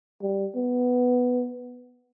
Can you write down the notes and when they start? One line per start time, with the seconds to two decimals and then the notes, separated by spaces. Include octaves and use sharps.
0.22 G3
0.55 B3